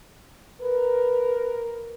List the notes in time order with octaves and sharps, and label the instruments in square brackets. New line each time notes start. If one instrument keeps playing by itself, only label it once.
[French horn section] A#4 [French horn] B4